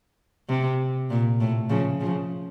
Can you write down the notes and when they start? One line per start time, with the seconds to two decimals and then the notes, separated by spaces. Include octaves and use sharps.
0.49 C3
1.10 A#2
1.40 A2
1.69 C#3 F3
2.00 C#3 F3